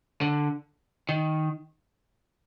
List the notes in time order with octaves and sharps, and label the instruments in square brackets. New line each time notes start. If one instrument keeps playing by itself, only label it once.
[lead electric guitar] D3
D#3